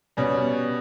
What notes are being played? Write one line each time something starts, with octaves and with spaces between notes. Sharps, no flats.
B2 G3 C#4